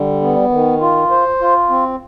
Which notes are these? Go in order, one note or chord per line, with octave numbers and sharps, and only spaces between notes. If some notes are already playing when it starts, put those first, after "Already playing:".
Already playing: D3 G3
B3
D#3
F4
C5
F4
C4